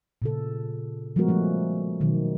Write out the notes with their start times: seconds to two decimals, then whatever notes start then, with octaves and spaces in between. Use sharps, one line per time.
0.22 A#2 C#3 A4
1.16 F3 G3 G#3 B3 F#4 A#4
1.28 F3 A3 C#4
2.00 B2 D#3 F#3